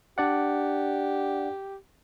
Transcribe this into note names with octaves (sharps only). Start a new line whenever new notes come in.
D4 G4 D5 F#5